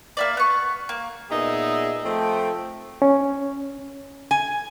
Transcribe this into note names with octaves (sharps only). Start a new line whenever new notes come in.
A#3 E4 D5
B3 C#6
A#3
A#2 B3 D#4 G#4 E5
F3 A3 C4 G5
C#4
G#5